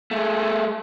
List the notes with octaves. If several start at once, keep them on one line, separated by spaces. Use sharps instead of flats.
G#3 A3